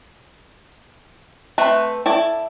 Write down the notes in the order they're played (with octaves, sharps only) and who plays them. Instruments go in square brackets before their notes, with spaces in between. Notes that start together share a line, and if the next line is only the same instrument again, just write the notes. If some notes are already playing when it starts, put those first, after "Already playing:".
[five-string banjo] A3 C4 B4 E5
E4 A4 D5